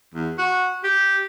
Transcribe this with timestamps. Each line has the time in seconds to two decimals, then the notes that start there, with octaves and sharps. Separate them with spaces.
0.14 E2
0.38 F#4
0.84 G4